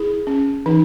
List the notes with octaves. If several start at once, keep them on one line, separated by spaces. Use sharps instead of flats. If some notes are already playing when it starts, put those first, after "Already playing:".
Already playing: E4 G#4
C#4
E3 D#4